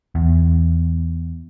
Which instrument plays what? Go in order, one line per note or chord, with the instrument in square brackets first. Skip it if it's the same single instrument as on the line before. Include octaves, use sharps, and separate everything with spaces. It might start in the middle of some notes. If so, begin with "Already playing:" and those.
[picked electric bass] E2